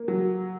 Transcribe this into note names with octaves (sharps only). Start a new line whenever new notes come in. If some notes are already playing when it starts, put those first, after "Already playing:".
Already playing: A#3
F#3